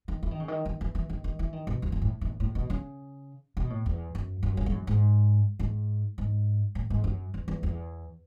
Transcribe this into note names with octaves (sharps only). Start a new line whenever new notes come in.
D#3
E3
D#3
C#3
D#3
D#3
E3
E3
D#3
D#3
E3
D#3
B2
E2
F#2
A2
E3
A2
A2
B2
C#3
B2
A2
E2
F#2
F#2
F#2
G#2
F#2
G#2
G#2
G#2
A2
G#2
F#2
E2
E2
E2